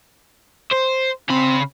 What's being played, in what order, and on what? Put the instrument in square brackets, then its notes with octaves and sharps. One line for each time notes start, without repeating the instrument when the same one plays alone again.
[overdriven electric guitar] C5
[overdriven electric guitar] C#3 B5 [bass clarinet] C4